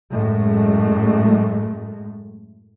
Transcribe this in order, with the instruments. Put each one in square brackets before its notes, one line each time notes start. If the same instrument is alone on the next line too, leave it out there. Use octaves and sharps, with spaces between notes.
[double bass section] F#2 A2 G#3 A3